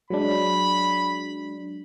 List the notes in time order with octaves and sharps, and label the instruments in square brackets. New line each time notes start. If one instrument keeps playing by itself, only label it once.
[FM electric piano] F#3 G#3 D4 [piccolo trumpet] B5